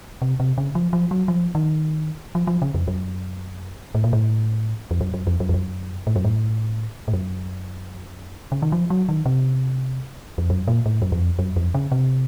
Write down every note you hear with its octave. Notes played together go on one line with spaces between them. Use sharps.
C3
C3
C#3
F3
F3
F#3
F3
D#3
F3
F3
C#3
F2
F#2
A2
A#2
A2
F2
F#2
F#2
F2
F#2
F2
F#2
A2
F#2
A2
A2
F#2
C#3
D#3
F3
F#3
D#3
C3
F2
F#2
A#2
A2
F#2
F2
F#2
F2
C#3
C3